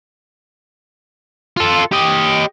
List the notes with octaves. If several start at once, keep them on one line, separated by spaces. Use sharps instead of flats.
F4 A4
G4 D#5